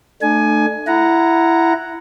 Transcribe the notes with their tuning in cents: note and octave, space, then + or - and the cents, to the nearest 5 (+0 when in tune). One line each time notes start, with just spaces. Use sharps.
A3 +0 D4 +40 G#5 +15
E4 +15 F#5 +0 A#5 +0